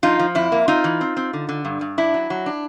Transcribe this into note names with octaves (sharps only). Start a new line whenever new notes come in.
F3 D#4 F4
F3
F2 E4
A#3
C4 D#4 F4
E3
C4
C4
D3
D3
G2
G2
D4 E4
F#3
F#3
D4